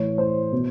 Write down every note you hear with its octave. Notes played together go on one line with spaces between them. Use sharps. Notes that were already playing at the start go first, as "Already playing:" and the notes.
Already playing: A2 E3 C#5
C5
B2